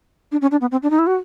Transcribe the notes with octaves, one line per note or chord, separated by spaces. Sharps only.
D4
C#4
D4
B3
C4
D4
D#4
E4
F#4